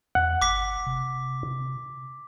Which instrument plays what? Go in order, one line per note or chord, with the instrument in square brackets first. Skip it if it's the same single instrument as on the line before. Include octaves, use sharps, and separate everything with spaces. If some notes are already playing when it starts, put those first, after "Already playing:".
[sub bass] E2 [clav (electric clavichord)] F#5
[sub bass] G1 [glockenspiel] D6 B6
[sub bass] C3